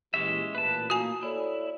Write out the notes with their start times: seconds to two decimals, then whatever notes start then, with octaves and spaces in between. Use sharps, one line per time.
0.14 A#2 E3 G#3 C#4 G4 E5
0.55 A1 A#2 B4 A5
0.90 A#3 F#4 G#5
1.23 E4 A4 C#5 D5